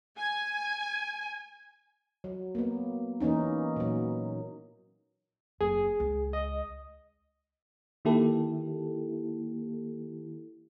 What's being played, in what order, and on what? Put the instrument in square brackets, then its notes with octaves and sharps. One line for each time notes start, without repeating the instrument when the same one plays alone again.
[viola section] G#5
[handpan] F#3
A#3 B3
E3 A#3 C#4 D#4
A#2 F#3
[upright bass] F#1 F#3 [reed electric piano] G#4
[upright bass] C#2
[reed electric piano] D#5
[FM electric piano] D#3 A#3 E4 G4 A4